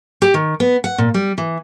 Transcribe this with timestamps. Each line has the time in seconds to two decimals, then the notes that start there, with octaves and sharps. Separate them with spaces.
0.22 G4
0.34 D#3
0.60 B3
0.84 F#5
0.98 A#2
1.14 G3
1.38 E3